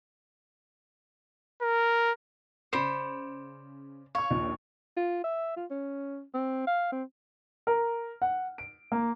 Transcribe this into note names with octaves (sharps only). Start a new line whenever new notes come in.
A#4
C#3 C5 D5 B5 C#7 E7
C#5 F5 C#6
A#1 D#2 A#2
F4
E5
F4
C#4
C4
F5
C4
A#4
F#5
D7
A#3